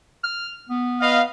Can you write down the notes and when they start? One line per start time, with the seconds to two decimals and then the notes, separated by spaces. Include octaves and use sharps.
0.24 F6
0.69 B3
1.01 B4 D#5 F5